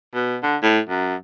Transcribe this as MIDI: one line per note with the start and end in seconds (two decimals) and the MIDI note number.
0.14 0.38 47
0.43 0.57 50
0.63 0.79 45
0.89 1.15 42